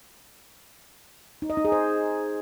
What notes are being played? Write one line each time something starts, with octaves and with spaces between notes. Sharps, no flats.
D#4
D#5
D#4
G#4
C5